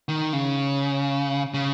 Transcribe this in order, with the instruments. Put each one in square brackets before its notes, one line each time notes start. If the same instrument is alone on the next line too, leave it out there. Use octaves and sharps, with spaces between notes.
[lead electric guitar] D#3
C#3
C#3